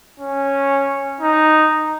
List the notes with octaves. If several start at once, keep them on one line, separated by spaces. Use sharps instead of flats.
C#4
D#4